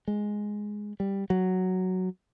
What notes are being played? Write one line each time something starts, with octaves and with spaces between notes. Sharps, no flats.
G#3
G3
F#3